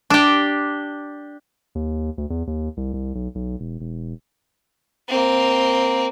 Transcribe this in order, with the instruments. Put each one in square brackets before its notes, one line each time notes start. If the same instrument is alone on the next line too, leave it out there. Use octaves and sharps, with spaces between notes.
[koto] D4 G4
[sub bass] D#2
D2
E2
D#2
C2
C2
B1
B1
E1
E1
[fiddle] A#3 C4